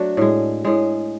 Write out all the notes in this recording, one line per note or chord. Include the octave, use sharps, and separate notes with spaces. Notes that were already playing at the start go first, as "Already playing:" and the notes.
Already playing: F#3 A3 D4 F#4
A2 G#3
A2 G#3